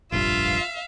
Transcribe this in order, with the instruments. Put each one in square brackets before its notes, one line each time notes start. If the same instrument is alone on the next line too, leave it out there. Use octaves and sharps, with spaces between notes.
[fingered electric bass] F1 A#1 G2 [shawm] F4 [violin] E5 F5